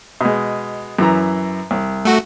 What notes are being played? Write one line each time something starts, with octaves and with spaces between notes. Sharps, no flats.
B2 G#3
F#2 E3 A#5
C2
A3 F#4